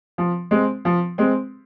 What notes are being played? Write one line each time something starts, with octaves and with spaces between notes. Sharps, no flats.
F3
G#3 C4
F3
G#3 C4